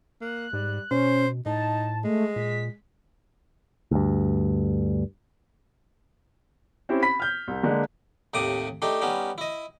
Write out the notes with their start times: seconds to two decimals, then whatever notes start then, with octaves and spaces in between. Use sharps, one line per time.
0.21 A#3 F#6
0.53 G#2 G3
0.91 B2 C#4 C5
1.46 A2 D#4 A5
2.04 G#3 A3
2.36 A#2 B6
3.91 D2 G2
6.89 C4 C#4 E4 G4
7.02 B5 B6
7.20 F6 G6
7.48 C2
7.63 D3 G#3 A#3
8.34 D#2 A2 C3 D6 D#6
8.82 A3 D4 D#4 G4
9.02 G3 B3 C#4 D#4
9.38 E4 D#5